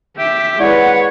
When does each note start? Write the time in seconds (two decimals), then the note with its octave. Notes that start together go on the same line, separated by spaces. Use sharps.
0.18 G4 E5
0.60 G#3 E4 B4 C#5 D5 F#5